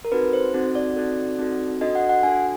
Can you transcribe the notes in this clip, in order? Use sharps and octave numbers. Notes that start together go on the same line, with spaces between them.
A#4
C4 D#4 F#4 A4 B4
C5
C4 D#4 F#4 A4
D5
C4 D#4 F#4 A4
C4 D#4 F#4 A4
D4 F#4 A4 D#5
F#5
F#5
D4 F#4 A4 G#5